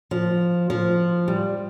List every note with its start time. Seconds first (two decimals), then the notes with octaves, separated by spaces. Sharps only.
0.11 F3
0.70 F3
1.28 G3